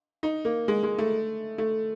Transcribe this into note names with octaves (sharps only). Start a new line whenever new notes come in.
D#4
A#3
G#3
G#3
A3
A3